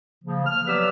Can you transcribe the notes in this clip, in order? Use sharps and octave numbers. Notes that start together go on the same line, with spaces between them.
C#3 F3 A#3
F6
F#3 B3 G4 B4 D5 E6